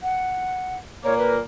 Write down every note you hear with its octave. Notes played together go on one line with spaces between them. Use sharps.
F#5
A#2 A#3 C#5
B4